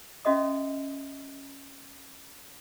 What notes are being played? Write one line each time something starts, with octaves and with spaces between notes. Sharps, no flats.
C#4 F#4 D#5 E5 D#6